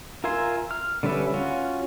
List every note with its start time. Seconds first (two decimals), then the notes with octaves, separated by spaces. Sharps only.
0.24 F4 A#4 E5 G#5 C6
0.71 F6
1.03 D3 G3 C#4 B4 E5
1.34 C#4 F4 F#4